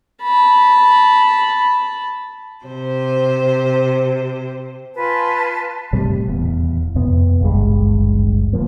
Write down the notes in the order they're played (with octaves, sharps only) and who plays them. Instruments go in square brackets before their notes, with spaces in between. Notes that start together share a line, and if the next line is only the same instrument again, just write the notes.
[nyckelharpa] A5 B5
[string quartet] C3 C5
[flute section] F4 B4 G#5 A5
[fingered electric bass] A2 C3 G3
D#1 E2
F2 C3 B3
D1 G#1 G2 G#3
D1 E2 F3 A#3